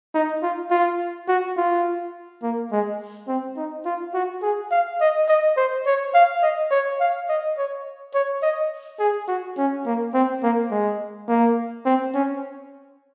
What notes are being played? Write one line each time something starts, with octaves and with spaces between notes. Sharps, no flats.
D#4
F4
F4
F#4
F4
A#3
G#3
C4
D#4
F4
F#4
G#4
F5
D#5
D#5
C5
C#5
F5
D#5
C#5
F5
D#5
C#5
C#5
D#5
G#4
F#4
C#4
A#3
C4
A#3
G#3
A#3
C4
C#4